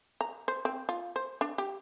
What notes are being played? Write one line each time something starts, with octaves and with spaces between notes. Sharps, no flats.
A#5
C5
C4
F4
C5
D4
G4